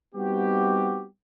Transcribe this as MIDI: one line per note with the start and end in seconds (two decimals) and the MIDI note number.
0.15 1.07 55
0.15 1.07 59
0.15 1.07 60
0.15 1.07 63
0.15 1.07 66
0.15 1.07 67